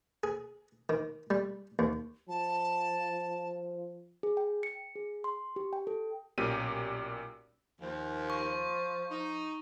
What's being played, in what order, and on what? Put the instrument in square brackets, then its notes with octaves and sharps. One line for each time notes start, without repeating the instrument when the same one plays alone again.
[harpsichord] G#4
D#3
G3
D#2
[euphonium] F3 [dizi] A5
[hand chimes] G#4
G5
C#7
G#4
C6
G4
G5
A4
[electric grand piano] B1 A#2 C#4 G4 A#4 D#7
[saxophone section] D#2 [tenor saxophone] F3
[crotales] C#6
[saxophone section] D#4